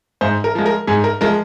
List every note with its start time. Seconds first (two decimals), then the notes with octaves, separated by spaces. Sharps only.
0.21 G#2 C5
0.44 A#4
0.55 F3 G#3
0.66 A#4
0.87 G#2 G#4
1.04 A#4
1.21 F3 G#3 A#4